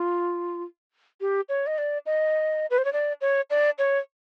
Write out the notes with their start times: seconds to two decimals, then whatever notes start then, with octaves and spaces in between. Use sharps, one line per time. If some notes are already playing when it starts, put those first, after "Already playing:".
Already playing: F4
1.21 G4
1.49 C#5
1.67 D#5
1.78 D5
2.06 D#5
2.70 B4
2.78 C5
2.85 C#5
2.93 D5
3.21 C#5
3.50 D5
3.79 C#5